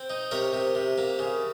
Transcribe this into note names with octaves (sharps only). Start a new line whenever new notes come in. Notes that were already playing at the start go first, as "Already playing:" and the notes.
Already playing: C4
D#4
C3 A#4 C#5
C3
C3
A#3
C#3